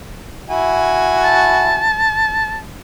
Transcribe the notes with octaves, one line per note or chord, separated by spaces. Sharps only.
E4 F#4 G#5
A5